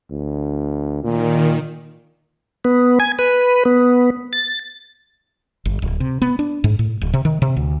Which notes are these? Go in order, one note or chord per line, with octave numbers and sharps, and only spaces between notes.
D2
A#2 D#3
B3
G#5
B4
B3
A6
G1
D1
C3
B3
D4
G#2
A2
D1
C3
D#3
C3
D2